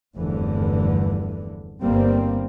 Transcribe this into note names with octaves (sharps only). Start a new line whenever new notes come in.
F1 E2 G2 D3 E3
G1 G3 A#3 C4